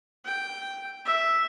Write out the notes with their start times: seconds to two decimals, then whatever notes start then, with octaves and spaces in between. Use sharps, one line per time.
0.25 G5
1.05 E5